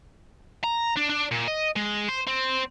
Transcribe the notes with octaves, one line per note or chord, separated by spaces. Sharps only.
A#5
D4
D4
A#2
D#5
G#3
C5
C4